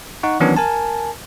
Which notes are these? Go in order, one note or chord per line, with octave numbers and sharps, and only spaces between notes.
D#4 F#5 C#6
D#3 E3 F#3 B3 C#4 D4
A#4 G#5 A5